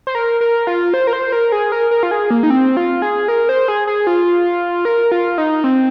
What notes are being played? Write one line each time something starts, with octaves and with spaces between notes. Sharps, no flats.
C5
A#4
A#4
F4
C5
A#4
C5
A#4
G#4
A#4
A#4
F4
G#4
A#3
D#4
C4
F4
G#4
A#4
C5
G#4
G#4
F4
A#4
F4
D#4
C4